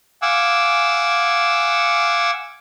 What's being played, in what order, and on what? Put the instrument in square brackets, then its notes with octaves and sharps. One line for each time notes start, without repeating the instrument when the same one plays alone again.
[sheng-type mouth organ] F5 F#5 G#5 D6 E6